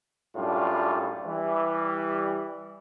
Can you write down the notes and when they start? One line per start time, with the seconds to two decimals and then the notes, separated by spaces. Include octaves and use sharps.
0.36 F#2 A2 G3 D4 F4
1.26 E3 G3